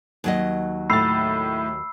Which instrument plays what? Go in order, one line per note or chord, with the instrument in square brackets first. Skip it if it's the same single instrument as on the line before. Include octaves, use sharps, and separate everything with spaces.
[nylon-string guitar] D#2 F#3 D#5
[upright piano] A2 A6 [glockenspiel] B5 E6 C7